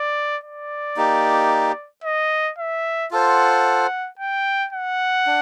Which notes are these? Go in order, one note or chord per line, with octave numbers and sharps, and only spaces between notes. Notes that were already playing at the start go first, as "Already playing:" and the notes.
Already playing: D5
D5
A#3 D#4 G4
D#5
E5
F4 A4 C5 F#5
G5
F#5
D4